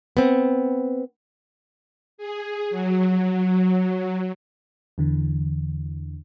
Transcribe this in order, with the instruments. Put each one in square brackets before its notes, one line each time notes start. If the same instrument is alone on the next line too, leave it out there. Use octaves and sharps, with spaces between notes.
[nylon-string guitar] B3 C4
[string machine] G#4
F#3
[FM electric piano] E2 D3 E3